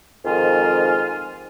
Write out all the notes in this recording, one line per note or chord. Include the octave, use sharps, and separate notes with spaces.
F2 G#2 D#3 F4 G#5